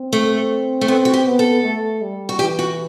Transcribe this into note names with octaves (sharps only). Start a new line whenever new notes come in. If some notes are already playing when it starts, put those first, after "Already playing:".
Already playing: C4
A3
A3
B3 C4
F#4
G4
B3
A4
A3
G3
F#4
E3 G4
F#4